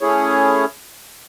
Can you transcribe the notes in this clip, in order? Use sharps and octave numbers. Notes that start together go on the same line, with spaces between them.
A3 C#4 E4 G#4 C#5